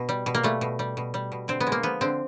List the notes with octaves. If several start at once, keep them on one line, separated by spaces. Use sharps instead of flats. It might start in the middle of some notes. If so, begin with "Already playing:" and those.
Already playing: B2
G3
B2
A#3
G3 A3
B2
G3
B2
G3
B2
D3 C4
B3
G#3
A#3
F3 B3
D3 C4